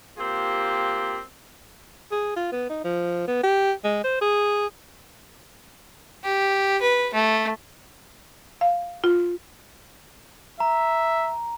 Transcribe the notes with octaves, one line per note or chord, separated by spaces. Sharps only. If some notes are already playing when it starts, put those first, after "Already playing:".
A#3 C4 F4 G4
G#4
F4
B3
D#4
F3
B3
G4
G#3
C5
G#4
G4
B4
A3
F5
F4
E5 A#5